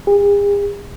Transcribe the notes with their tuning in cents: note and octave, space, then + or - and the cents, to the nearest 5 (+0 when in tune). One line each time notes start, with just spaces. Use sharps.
G#4 -45